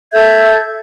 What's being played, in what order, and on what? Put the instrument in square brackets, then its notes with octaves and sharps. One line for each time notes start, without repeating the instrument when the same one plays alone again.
[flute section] A4 E5 G6 G#6